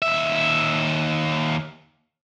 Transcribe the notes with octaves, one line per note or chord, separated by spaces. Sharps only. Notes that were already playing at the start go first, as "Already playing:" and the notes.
D#2 E5